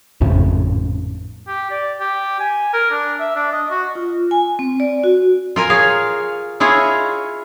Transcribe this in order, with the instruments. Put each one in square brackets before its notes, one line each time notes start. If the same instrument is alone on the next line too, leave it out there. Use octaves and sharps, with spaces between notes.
[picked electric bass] G#1 F2 A2 C#3
[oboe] G4
D5
G4
G#5
A#4
D4
E5
D4
D#5
F#4
[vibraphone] F4
G#5
C4
D5
F#4
[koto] F4 A#4 G#5
G#4 C#5 F5
E4 F4 G#4 C#5 D#5